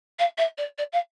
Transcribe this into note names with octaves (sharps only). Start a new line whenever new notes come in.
F5
E5
D5
D5
F5